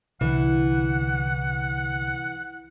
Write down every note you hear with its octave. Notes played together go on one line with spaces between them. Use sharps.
C2 D3 E3 F#5